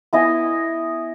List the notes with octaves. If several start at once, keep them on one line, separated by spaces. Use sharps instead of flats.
B3 E4 D#5 G#5